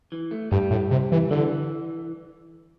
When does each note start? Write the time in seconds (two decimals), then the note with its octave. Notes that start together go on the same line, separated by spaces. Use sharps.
0.12 E3
0.31 A3
0.51 G2 G3
0.71 A2
0.91 C3
1.12 E3
1.31 D3 E3